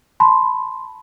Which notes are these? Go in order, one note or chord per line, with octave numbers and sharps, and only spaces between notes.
A5 B5 C6